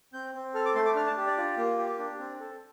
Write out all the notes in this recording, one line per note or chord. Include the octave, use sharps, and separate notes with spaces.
C4 G6
C4
A4 F6
D6
A3 C6
D6
D4 F6
A5
G4
D5
F4
A#3
G4
D4
C4
A4